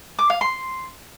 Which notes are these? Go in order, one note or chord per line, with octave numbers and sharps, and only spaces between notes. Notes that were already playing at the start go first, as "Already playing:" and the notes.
D6
F5
C6